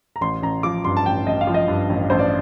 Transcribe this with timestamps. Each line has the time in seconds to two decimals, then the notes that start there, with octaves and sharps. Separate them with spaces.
0.16 A#5
0.21 A1 C6
0.42 A1 A#5
0.63 F3 D6
0.84 G2 C6
0.97 A5
1.06 A1 G5
1.26 A1 D#5
1.41 F5
1.47 F3
1.54 D#5
1.68 G2
1.90 A1
2.10 A1 C5
2.19 D5